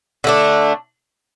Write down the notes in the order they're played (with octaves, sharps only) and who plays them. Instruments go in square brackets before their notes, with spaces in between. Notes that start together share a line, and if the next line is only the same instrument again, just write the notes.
[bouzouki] D3 A3 D4